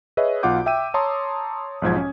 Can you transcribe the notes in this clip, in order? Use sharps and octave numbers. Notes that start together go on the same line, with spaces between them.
G#4 B4 C#5 D#5 E5
B1 B2 F4 F#5 D6 G6
E5 G5 E6 D#7
C#5 A5 A#5 C6 D#6
B1 G#2 F3 G#6
C#4